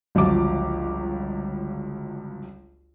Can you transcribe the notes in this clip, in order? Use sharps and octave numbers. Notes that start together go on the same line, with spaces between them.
G1 C#2 F3 F#3 D6